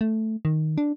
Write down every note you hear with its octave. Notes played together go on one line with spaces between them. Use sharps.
A3
D#3
D4